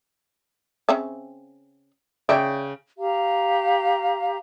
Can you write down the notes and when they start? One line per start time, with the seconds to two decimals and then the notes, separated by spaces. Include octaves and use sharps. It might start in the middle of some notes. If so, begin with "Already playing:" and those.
0.89 C#3 C4 E5
2.29 C#3 C#5 D5 E5 G5
2.98 G4 F5 A#5